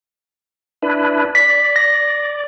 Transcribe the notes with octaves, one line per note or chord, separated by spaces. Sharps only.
D4 E4 B4
D5 B6
A#6